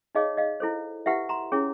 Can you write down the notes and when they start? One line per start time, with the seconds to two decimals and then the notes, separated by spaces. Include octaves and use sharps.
0.15 D#4 G#4 C#5 D#5 F5
0.37 D#5 F5
0.60 E4 A4 C5
1.06 E4 G4 B4 E5 F#5
1.29 A#5 C6
1.52 C#4 E4 G#4 C#5